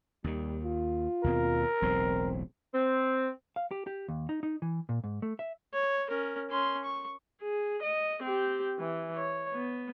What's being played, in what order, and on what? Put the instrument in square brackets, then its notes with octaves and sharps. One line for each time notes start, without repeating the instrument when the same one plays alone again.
[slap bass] D#2 D#3 [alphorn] G3
[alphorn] F4
[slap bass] D#2 B2 C4 [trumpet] A#4
[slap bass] E1 B1 A2 [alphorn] C4
[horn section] C4
[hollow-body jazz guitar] F5
G4
G4
D#2
D#4
D#4
E3
A#2
G#2
A3
E5
[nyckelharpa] C#5
C#4 A#4
C#4 C6
C#6
[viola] G#4
D#5
C4 G4
E3
C#5
B3